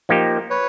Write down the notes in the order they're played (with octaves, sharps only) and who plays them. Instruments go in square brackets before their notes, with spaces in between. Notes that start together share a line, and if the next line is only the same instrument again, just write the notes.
[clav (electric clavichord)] F3 A#3 D#4 G4
[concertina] B4 C#5